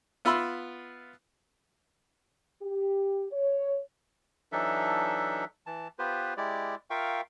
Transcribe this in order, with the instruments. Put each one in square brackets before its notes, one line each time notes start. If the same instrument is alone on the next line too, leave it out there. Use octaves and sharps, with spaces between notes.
[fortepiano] B3 F4 E5 B5 C6 E6
[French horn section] G4
C#5
[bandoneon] E3 F#3 D4 D#4 A4 E5
E3 A5
B3 F4 G4 B4 C5
G#3 E4 G4 D5
F4 A#4 E5 F5 G5 C#6